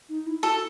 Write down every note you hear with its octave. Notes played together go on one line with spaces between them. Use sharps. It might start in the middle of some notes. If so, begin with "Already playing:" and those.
D#4
E4
F#4 A4